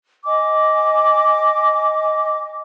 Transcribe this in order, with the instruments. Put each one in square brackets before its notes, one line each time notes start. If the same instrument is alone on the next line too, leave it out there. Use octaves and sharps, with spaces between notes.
[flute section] D#5 G#5 D6